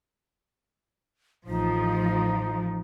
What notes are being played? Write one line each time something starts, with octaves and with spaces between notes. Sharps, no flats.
A1 F3 D#4